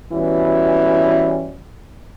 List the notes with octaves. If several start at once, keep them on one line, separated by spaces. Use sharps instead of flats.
E3 G3 B3 C#4 E4 F#4